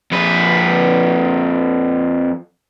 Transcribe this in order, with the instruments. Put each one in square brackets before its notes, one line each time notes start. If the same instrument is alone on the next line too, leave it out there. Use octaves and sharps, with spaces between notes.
[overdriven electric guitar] F2 B4